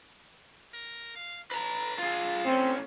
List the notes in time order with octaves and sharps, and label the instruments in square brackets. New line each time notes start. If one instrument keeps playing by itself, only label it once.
[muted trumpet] A#4
F5
[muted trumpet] D4 [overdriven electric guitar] B4 A#5
[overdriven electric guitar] F4 G#4
[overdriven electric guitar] A2 C#4 [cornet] C4